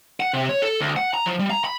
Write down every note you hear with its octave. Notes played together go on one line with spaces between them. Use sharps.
F#5
C3
C#5
A4
D2
F#5
A#5
F3
G3
A#5
B5